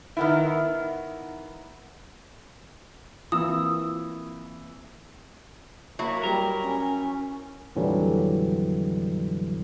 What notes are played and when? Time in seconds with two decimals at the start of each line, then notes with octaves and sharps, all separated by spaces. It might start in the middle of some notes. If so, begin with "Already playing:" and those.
0.17 D#3 B3 E4
3.32 E3 A#3 C4 F4 D#6 E6
5.99 F#3 A#3 E4
6.24 G3 A#4
6.63 C#4
7.75 F2 A#2 D3 E3 F#3 G3